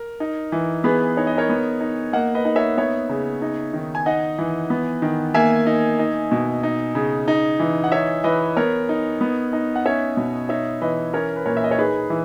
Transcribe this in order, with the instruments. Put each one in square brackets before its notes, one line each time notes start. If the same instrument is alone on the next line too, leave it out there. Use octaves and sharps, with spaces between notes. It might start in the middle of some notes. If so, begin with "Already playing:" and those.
Already playing: [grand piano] A#4
D#4
E3
B3 G#4 B4
D#4 C#5
D#5
A#4 C#5
B3
D#4
A#3 D#5 F#5
B4 D#5
D#4 D#5
C#5 E5
B3 C#5 E5
C#3
D#4
D#3
G#5
D#4 D#5 F#5
E3
B3
D#3
A#3 E5 G#5
D#4
D#4
B2
D#4
C#3
D#4
E3
F#5
D#4 C#5 E5
E3 B4 D#5
B3 A#4 C#5
D#4
B3
D#4
F#5
C#4 C#5 E5
B2
D#4 C#5 E5
E3 B4 D#5
C#4 A#4 C#5
B4
A#2 A#4 C#5
E5
D#5
C#5
D#4 G#4 B4
E3